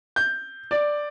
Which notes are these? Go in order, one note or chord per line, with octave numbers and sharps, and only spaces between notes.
G6
D5